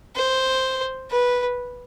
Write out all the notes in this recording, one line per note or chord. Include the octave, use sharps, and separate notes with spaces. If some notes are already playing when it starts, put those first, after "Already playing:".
C5
B4